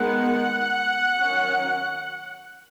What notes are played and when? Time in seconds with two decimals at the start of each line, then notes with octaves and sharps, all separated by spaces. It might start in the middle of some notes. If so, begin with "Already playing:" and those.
Already playing: D#3 G#3 B3 F#5
1.19 D#3 F#3 C#4